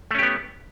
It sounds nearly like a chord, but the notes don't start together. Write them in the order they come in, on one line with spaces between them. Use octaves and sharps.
A3 C#4 G4 B3